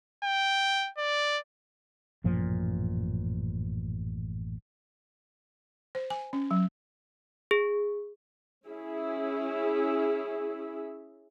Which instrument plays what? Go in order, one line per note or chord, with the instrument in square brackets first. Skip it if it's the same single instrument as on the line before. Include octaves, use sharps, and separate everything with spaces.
[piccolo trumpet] G5
D5
[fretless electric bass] A1 F#2 A#2 F3
[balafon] C5
G#5
C#4
F#3
[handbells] G#4
[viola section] C#4 E4 G#4 E5